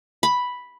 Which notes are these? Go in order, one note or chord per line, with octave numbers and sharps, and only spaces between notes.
B5